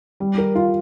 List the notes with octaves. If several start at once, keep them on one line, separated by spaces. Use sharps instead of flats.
G3
A#4
F4